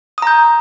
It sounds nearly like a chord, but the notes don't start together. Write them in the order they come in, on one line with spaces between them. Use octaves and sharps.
D#6 A#5 G6